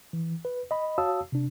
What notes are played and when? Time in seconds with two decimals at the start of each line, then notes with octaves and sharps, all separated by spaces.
0.13 E3
0.45 B4
0.71 D#5 B5
0.98 F#4 C#5 F5 A5 D#6 E6
1.32 C3 D4